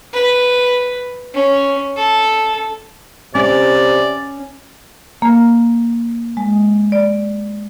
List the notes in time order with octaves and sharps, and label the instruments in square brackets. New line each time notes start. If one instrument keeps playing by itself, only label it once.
[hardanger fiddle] B4
C#4
A4
[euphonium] C3 [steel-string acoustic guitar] C#4 [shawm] D5
[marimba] A#3
G#3
D5